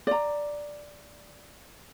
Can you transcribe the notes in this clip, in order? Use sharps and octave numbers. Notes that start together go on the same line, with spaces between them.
D5 A#5